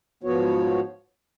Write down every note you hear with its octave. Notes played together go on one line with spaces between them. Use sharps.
G#2 F3 B3 F#4 C#5